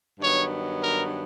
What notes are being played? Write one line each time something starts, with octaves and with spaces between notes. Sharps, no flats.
G2 D#3 F#3 B3 C#5
A#4